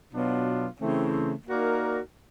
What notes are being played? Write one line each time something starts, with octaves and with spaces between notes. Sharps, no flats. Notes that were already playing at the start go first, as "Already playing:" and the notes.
B2 F#3 B3 D4 F4
C#3 E3 A3 C4
A#3 D#4 F#4 A#4 D5